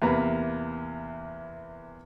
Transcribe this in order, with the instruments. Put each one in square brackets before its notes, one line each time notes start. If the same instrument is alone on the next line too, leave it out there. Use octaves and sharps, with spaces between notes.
[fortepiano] E2 C3 A#3 B4 A#5